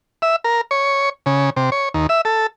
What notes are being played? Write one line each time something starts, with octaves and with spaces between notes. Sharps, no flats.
E5
A#4
C#5
C#3
C3
C#5
D#2
E5
A4